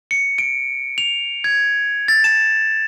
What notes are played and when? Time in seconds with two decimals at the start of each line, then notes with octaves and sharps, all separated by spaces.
0.11 C#7
0.38 D7
0.98 F7
1.44 G#6
2.08 A6
2.24 E7